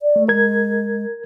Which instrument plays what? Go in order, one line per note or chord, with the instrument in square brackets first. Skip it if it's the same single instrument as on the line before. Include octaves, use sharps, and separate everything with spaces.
[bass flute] D5
[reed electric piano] A3
[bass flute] G#3 [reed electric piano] A#4 G#6